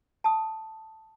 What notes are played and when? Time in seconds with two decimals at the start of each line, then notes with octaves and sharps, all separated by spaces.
0.24 A5 D#6